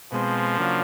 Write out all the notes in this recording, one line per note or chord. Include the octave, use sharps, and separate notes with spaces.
B2 F3 G#3 C4
C#3 F#3 A#3 D4 F4